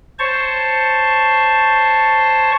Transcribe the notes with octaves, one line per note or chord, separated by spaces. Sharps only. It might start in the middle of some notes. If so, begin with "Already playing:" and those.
C5 C#5 A5 C#6